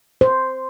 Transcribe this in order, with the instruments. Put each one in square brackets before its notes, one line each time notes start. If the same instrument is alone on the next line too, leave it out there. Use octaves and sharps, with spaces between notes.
[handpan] C5